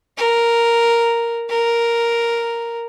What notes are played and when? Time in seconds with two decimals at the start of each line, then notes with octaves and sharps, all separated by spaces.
0.18 A#4
1.50 A#4